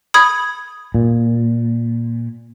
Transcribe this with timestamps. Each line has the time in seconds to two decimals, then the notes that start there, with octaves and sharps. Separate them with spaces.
0.14 B5 D#6 G#6
0.95 A#2